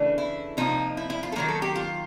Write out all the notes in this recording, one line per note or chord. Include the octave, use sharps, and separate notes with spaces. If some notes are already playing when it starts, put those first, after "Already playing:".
Already playing: C#3 E3 A3 D4
E4
C3 F3 A#3 D#4
E4
E4
F4
A4
D#3 F#3 A#3 A#4
A4
G4
F4